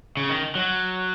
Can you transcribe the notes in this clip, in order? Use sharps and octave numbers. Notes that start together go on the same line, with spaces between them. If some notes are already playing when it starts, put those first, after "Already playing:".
C#3
D#3
F#3